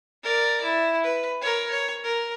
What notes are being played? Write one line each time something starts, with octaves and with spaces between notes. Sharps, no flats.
A#4 D5
E4
B4
A#4 C#5
C#5
A#4